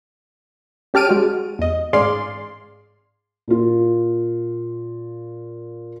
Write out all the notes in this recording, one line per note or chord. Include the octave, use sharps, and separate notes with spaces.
C#4 G4 A5 F6 D7 D#7
G#3 F#4
E2 D#5
A1 G#2 G#4 D5 F5 C6
A#2 F4